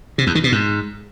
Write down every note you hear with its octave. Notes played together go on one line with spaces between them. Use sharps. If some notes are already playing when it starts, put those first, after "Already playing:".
C3
E2
D#3
B2
G#2